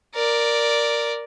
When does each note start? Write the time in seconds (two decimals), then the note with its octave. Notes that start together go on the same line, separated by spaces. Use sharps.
0.15 A#4 D5